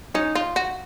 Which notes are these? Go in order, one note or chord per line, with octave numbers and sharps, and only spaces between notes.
C#4 D#4
F4
F#4